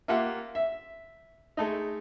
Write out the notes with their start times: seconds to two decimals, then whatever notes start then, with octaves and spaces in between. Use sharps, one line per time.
0.08 A#3 F4 G4 E5 F#5
0.55 E5
1.57 G#3 A3 D#4